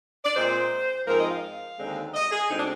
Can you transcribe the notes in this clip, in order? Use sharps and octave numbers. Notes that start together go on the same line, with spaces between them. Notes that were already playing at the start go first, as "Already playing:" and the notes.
D5
A#2 G#3 C4 C5
G#2 F3 C4 A#4
D#5
F5
D#2 D3 G#3 C4
D#5
G#4
D2 D3 G#3 C4 D#4
D4